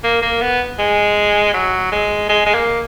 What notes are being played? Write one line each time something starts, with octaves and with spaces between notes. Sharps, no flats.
A#3
A#3
B3
G#3
F#3
G#3
G#3
G#3
A#3